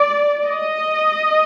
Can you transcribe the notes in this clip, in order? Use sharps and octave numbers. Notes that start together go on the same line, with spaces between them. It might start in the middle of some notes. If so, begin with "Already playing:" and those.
Already playing: D5
D#5